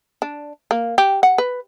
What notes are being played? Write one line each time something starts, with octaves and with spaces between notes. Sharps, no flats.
D4
A#3
G4
F#5
B4